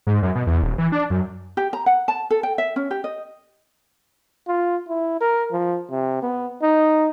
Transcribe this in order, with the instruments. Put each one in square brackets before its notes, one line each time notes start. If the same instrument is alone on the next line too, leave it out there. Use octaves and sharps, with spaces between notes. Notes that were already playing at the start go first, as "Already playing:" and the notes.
[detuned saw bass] G#2
F#2
B2
E2
D#1
E3
D4
F#2
[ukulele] G4
A#5
F#5
A5
A4
G5
E5
C#4
G4
D#5
[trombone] F4
E4
A#4
F3
C3
B3
D#4